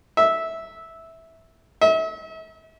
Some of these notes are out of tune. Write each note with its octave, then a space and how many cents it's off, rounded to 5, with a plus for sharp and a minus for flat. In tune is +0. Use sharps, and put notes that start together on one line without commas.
E5 -10
E5 -40